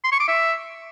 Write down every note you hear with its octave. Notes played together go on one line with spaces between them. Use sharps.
C6
C#6
D6
E5